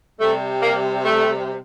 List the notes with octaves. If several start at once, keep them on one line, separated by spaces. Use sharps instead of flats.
C3 G3 A3
A#3
A3